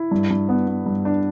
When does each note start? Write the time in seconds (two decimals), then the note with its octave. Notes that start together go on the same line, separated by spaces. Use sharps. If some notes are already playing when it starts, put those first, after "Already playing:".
Already playing: E4
0.11 G2
0.30 G2
0.49 B3
0.67 B3
0.86 G2
1.05 D4